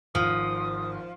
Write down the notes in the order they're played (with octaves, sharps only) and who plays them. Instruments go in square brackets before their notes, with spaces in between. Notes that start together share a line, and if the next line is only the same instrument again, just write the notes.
[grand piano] G#1 [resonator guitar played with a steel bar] F3 [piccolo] D#6